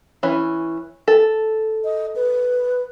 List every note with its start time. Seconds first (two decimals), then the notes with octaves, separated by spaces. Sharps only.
0.23 E3 C#4
1.08 A4
1.84 D#5
2.16 B4